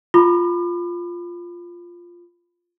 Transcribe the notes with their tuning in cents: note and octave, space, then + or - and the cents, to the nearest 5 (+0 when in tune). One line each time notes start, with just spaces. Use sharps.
F4 +0 B5 +20 D6 +40